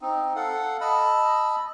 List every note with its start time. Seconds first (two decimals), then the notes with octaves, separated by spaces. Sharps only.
0.01 C4 D#4
0.36 A4 F5 F#5
0.81 D#5 A5 B5 E6